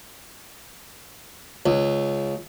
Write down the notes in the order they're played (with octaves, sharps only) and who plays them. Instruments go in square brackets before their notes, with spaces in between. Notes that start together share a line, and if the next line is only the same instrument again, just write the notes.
[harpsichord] C#2